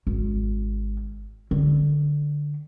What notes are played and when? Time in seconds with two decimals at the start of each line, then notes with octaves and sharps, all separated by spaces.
0.07 G#1
1.51 D3